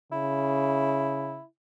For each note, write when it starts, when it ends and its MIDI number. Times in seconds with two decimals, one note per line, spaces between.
0.12 1.40 49
0.12 1.44 64